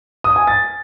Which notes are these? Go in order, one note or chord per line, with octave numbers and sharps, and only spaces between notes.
D#6
G#5
A6